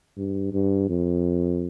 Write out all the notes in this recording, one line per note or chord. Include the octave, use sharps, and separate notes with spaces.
G2
G2
F2